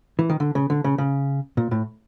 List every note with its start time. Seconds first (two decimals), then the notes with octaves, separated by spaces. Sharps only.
0.19 E3
0.29 D#3
0.40 D3
0.55 C#3
0.70 D3
0.84 C#3
0.98 C#3
1.57 A#2
1.71 A2